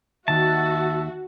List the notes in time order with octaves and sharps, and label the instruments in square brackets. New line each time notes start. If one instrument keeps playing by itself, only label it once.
[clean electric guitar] D#2 D#3 [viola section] F#4 [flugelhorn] E5 [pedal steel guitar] A5